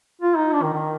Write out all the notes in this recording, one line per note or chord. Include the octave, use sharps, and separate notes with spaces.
F4
D#4
D4
D#3
D#3